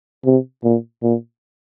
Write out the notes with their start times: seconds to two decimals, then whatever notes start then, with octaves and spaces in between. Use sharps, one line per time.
0.25 C3
0.64 A#2
1.03 A#2